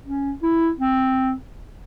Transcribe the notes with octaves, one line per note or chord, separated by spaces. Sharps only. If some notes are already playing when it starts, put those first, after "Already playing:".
C#4
E4
C4